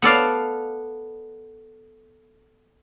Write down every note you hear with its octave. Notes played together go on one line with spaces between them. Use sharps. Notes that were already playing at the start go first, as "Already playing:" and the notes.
B3 A4 D5 F5